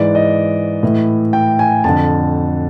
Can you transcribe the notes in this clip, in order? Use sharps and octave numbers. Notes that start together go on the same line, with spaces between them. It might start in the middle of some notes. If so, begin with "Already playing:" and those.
Already playing: G#2 E3 D5
D#5
A2 E3
G5
G#5
F2 D3 A5